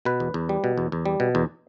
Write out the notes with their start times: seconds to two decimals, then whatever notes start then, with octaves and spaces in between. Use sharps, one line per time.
0.05 B2 B4
0.20 E2
0.34 E2
0.49 G3
0.64 B2
0.78 E2
0.92 E2
1.06 G3
1.20 B2
1.35 E2